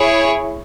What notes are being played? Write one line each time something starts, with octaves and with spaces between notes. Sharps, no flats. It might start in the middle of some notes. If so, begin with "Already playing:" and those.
Already playing: E4 G#4 C#5